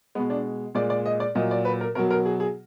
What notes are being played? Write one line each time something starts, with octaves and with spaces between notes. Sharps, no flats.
B2 G#3 B3
D4
A#2 G#3 D5
D5
D#5
D5
A#2 F#3 D#5
D5
B4
A#4
B2 F#3 A#4
A#4
G#4
G#4